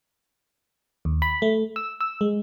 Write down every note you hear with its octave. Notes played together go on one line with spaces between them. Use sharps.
D#2
B5
A3
E6
E6
G#3